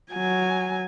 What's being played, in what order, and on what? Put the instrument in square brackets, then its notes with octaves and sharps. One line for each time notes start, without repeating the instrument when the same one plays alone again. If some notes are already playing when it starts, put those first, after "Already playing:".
[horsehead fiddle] F#3 G#5